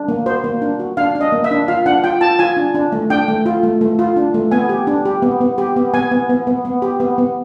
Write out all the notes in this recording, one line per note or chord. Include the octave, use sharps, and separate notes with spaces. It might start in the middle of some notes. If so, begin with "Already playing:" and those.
Already playing: D4
A#3
F#4 C5
A#3
D4
F#4
D4 F5
D4
D#5
A#3
E5
D4
F4 F5
D4 F#5
F4 G5
F4 A5
F4 G#5
D4
D4
A3
D4 G5
A3
F4
A3
A3
F4
D4
A3
B3 G#5
G4
D4
G4
B3
B3
G4
B3
B3 G#5
B3
B3
B3
B3
G4
B3
B3